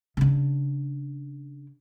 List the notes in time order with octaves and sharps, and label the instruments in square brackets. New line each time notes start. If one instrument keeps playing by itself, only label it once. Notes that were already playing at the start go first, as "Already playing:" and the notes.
[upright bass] C#3 D4